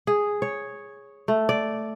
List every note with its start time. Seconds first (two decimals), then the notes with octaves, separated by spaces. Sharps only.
0.07 G#4
0.42 C#5
1.28 A3
1.49 D5